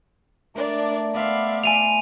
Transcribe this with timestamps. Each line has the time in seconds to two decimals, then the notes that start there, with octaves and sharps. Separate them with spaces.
0.55 A3 D4 A#4 D5
1.14 B3 C5 D5 E5 F5
1.64 G#5 D#7 F7